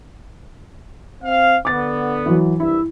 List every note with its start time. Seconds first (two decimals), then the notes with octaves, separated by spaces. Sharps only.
1.23 C4 F5
1.65 D3 B3 D6 A6
2.26 E3 F#3
2.60 C2 G2 E4 E5